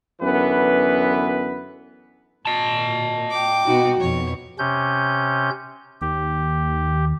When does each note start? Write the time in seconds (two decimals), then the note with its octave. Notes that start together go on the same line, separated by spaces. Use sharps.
0.21 F#2 D3 E3 B3 B4
2.45 A#2 D#5 A5
3.30 G5 D6
3.66 B2 D#4 F#4
4.00 F2 B2 C#5
4.59 C3 C#4 G6
6.02 D#2 G4